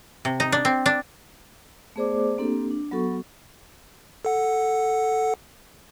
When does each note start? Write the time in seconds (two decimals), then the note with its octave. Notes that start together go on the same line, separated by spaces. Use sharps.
0.25 C3
0.40 D#4
0.52 D4
0.65 C4
0.86 D4
1.96 A3 B3 G#4 C5 D5 D6
2.38 A#3 C4 D4 G4 A4
2.71 D4
2.91 F#3 B3 F#4 A4 C#6
4.25 A4 F#5